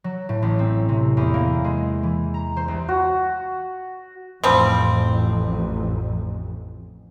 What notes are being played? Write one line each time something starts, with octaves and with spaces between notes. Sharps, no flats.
F#3
A2
A1
C4
C3
E2
A#3
G#3
E3
A#5
C5
C2
F#4
A1 F2 F3 G3 C4